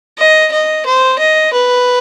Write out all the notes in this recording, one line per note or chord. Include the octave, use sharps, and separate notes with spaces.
D#5
D#5
C5
D#5
B4